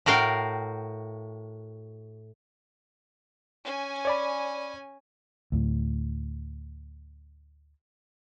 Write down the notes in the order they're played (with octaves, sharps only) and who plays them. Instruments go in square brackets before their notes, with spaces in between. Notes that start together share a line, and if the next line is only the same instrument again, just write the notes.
[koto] A2 F#4 A#4 F5 G5
[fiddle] C#4 G#5
[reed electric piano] C#5 D5 B5
[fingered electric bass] D2 A2